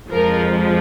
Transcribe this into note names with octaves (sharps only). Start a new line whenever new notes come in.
F2 F3 G#3 A#4